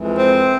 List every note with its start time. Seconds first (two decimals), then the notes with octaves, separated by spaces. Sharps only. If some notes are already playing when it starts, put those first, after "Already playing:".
Already playing: F2 E3 G#3
0.18 C4